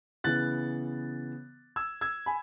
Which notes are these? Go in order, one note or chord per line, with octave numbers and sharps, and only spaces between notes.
C#3 E3 B3 F#6 A6
E6 G#6
E6 G#6
G#5 B5